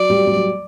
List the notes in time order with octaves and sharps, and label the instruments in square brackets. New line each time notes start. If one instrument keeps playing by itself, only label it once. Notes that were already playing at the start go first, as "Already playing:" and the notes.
Already playing: [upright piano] F#3 [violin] D5
[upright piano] G3
G3
F#3